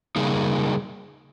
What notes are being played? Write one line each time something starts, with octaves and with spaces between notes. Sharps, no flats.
C#3 G3 A#3 D#4 G#4